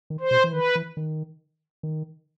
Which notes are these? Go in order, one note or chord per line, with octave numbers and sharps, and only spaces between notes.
D#3
C5
B2
E3
D#3 B4
E3
D#3
D#3